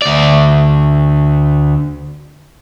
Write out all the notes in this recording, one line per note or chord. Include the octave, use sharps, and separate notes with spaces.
D2 D5